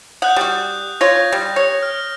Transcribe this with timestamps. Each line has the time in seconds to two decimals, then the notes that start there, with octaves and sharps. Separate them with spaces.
0.22 F#5 D#6 F#6 G6
0.36 G3 F#4
1.01 F4 C#5 A#6
1.32 G3
1.56 C#5
1.82 F6